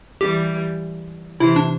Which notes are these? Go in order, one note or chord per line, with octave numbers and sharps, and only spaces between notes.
E3 G3 G4
C3 E3 E4
D4